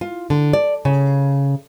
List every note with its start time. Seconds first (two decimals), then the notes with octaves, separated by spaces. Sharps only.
0.01 F4
0.30 D3
0.53 D5
0.85 C#3